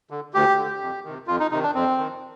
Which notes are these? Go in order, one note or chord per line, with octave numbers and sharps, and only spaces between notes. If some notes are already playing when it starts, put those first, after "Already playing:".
D3
D2 G4
D3
F2
C3 D#3
F2 F4
D#4
C3 D#3 D#4
D4
F2 C4
D#3